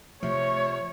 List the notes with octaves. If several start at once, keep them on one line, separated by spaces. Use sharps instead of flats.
C3 F3 A3 C#5